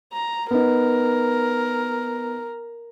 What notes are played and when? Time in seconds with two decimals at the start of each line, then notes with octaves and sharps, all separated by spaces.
0.13 A#5
0.51 B3 D#4 A#4